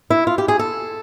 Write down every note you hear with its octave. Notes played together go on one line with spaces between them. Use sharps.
E4
F4
G4
G#4
A4